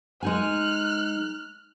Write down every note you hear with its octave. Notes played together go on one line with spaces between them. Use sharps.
G#3 D#4 G#5 F6 F#6